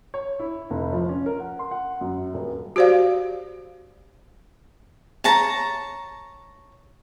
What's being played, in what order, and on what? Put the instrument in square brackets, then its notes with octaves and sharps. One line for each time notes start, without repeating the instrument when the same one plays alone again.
[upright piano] C#5
E4
F1
F3
C#4
A#4
F#5
C6
F#5
F#2
D#1
[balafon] F#4 G4 C5 D5 F5
[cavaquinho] C#5 A5 A#5